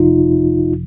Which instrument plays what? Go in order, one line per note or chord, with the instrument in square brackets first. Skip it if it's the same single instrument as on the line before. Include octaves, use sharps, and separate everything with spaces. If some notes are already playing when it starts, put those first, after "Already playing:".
Already playing: [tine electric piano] G1 F2 C3 F3 D#4 F4